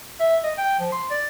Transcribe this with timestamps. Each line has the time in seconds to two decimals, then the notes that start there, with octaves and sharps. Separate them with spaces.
0.20 E5
0.44 D#5
0.58 G5
0.80 F3
0.92 C6
1.10 D5